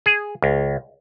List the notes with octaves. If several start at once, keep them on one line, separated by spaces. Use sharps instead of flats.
G#4
C#2